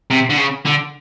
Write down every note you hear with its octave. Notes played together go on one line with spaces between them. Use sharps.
C3
D3
C#3
D3